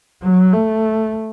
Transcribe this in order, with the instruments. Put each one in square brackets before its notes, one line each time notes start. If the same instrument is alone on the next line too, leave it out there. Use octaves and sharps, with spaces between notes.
[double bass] F#3
A3